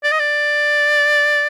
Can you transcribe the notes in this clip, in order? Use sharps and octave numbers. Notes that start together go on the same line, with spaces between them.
D5
D#5
D5